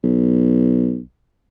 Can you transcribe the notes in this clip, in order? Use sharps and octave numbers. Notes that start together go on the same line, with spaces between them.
B1